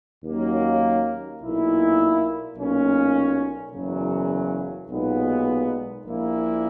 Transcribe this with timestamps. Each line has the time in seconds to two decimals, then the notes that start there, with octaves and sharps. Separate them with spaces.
0.24 D#2 D#3 F#3 A#3 C#4
1.40 B1 A#2 A#3 E4
2.56 B1 A#2 A#3 C#4
3.73 F#1 E2 C#3 F#3
4.89 B1 A#2 G#3 B3 D#4
6.05 A#1 A#2 A#3 E4